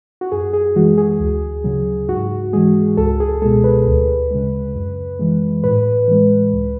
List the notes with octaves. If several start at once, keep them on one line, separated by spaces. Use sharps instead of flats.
F#4
F#2 G#4
G#4
E3 G#3 F#4
G#4
D2
C#3 F#3
G#2 F#4
E3 G#3 G#4
C#2 A4
G#4
B2 G#3 A4
B4
D2
C#3 G#3
F#2
E3 G#3
A2 B4
E3 G#3
C#2